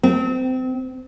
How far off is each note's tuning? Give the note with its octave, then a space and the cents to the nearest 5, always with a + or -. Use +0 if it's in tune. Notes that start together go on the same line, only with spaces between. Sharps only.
C4 -25